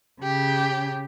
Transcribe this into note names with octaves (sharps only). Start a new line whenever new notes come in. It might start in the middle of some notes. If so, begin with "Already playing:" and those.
C#3 G4